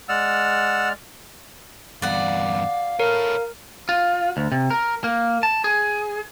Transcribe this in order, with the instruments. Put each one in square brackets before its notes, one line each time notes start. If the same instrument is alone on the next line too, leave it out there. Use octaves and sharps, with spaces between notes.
[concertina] G#3 D5 F6 [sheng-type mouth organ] F#5 E6
[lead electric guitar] E2 G2 [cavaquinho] D5 F#5 [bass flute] F5
[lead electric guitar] A4 C#5 [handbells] A#4
[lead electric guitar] F4
D2
C3
A#4
A#3
A5
G#4